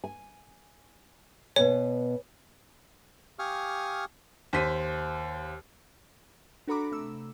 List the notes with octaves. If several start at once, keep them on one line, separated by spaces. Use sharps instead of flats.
G#5
B2 B3 C#5 G#5
G4 F5 G#5 C#6 D#6 F6
D#2 C5 B6 D#7
D4 F#4 A4 A#5 B5 D6
C3 A3 E6